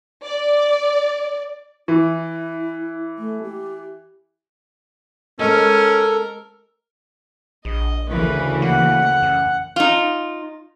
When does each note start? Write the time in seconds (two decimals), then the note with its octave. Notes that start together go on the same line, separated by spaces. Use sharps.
0.23 D5
1.88 E3 E4
3.18 A3
3.43 G4
5.39 G#3 C#4 A4 A#4 C5 D#5
7.65 A#1 D#5
8.10 D2 C#3 E3 A#4 B4
8.62 A#3 F#5
9.23 F#2
9.76 D#4 F4